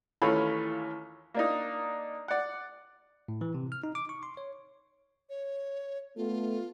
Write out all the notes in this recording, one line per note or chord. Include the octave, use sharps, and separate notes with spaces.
D#2 E3 A3 C#4 F4 B5
A#3 D4 D#4
D5 F#5
A2
E3
C3
F6
D#4
D6
C#6
C6
C#5
C#5
A3 B3 F4 A4